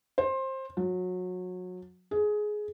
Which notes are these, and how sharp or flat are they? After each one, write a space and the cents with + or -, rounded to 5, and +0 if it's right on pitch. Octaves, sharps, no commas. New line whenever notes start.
C5 +20
F#3 -25
G#4 +15